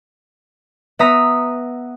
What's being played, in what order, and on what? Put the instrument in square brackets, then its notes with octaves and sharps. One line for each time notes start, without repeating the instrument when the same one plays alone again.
[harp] B3 E5 A#5 D#6 B6